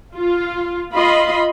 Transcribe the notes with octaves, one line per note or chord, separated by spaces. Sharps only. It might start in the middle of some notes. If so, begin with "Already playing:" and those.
F4
F4 D#5 B5 C6